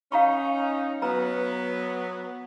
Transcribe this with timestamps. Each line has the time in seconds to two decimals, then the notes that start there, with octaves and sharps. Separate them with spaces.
0.12 C#4 D#4 F5 A#5 C#6
1.02 F#3 B3 B4 A#5